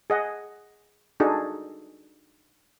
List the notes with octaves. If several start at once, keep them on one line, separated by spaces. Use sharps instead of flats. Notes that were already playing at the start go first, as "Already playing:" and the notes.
G#4 D#5 F#5
D4 D#4 F#4 G#4 A4